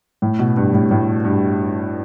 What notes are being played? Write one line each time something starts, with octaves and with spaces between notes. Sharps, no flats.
A2
B2
G2
A2
A2
G2